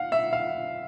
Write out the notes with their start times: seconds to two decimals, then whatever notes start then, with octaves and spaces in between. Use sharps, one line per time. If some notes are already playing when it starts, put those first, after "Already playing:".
Already playing: F5 F#5
0.12 E5
0.33 F5